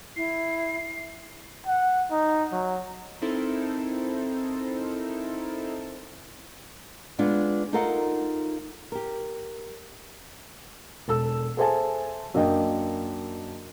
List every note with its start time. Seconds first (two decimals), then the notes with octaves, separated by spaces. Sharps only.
0.16 E4 C7
1.67 F#5
2.11 D#4
2.52 F#3
3.22 C4 D#4 E4 A4 A#4 C5
7.19 G#3 B3 D4 F4
7.73 D#4 F4 A4 A#4 F5 F#5
8.92 G4 A#4
11.08 E1 A4 E6
11.57 G#4 A4 C5 E5 G#5 A5
12.34 F#2 A#3 D4 D#5 G5